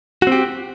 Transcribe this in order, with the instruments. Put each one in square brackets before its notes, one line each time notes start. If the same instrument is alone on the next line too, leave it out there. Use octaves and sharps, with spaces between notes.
[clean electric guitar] F#4
C4
G4